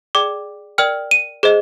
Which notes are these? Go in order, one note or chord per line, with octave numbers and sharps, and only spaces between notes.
G#4 D5 G5 D6
A#4 D5 G5 F6
D#7
G#4 C5 D#5